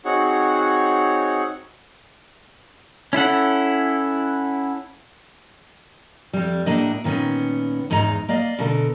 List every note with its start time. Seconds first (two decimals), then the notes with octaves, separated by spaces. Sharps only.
0.05 C4 D#4 F#4 G#4 C#5 F#5
3.13 C#4 E4 A4 F#5
6.33 F2 G3
6.66 A2 A#3 D4 D#5
7.04 A#2 D#3 B3 C#4
7.90 E2 G#2 G#3 D#4 A#5
8.29 A#3 D5 D#5 F5
8.59 B2 D3 A4 A#4